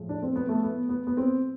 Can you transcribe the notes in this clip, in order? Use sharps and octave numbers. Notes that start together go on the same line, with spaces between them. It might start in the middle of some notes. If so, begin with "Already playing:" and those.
Already playing: A2 F3 G#3
D4
C4
B3
A3
B3
B3
B3
C4